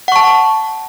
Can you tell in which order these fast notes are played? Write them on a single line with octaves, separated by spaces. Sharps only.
F#5 C#6 A5